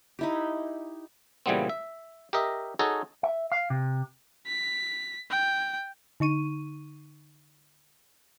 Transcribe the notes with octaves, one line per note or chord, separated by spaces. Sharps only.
D#4 E4 G4
A#2 C#3 E3 G3 B3 C4
E5
G4 A#4 D#5 E5
D#4 F#4 G#4 A4 C#5 D#5
E5
F5
C3
B6
G5
D3 D#4 C#6 D#7